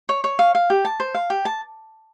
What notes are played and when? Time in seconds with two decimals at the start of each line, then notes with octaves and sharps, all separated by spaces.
0.09 C#5
0.24 C#5
0.39 F5
0.55 F5
0.70 G4
0.85 A5
1.00 C5
1.14 F5
1.30 G4
1.45 A5